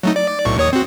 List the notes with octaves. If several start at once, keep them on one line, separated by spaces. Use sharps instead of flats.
F#3 A3 D#4
D5
B1 A2 C#6
D#2 C#5 D#6
C4 F#4